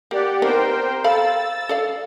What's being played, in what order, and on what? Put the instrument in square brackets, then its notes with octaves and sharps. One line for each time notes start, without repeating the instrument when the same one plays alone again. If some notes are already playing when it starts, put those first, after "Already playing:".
[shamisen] A#3 [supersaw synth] G4 D5 F#5
[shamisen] B3 C4 D#4 [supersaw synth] A#4 C5 G5
[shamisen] A4 F5 B5 [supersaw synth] E6 A6
[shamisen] A4 D5 F5